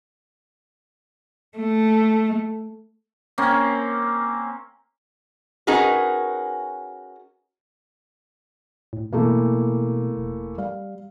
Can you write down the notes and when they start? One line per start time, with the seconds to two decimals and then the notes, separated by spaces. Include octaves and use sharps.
1.58 A3
3.38 A#3 C4 C#4
5.67 C#4 D#4 F#4 G#4 A#4 B4
8.93 A2
9.13 B2 E3 A3 A#3
10.17 E1
10.58 G3 F5